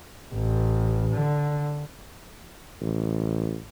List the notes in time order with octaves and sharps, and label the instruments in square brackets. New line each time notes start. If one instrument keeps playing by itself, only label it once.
[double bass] A1
D3
[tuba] A1